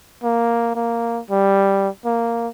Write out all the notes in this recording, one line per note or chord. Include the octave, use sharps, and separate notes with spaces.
A#3
A#3
G3
A#3